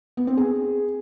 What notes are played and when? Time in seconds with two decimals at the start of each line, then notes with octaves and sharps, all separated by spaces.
0.17 B3
0.27 C4
0.37 G#4